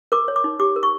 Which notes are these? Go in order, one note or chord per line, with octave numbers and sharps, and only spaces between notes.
A#4 D6
C#5
D6
D#4
G4 D6
A#4
C#6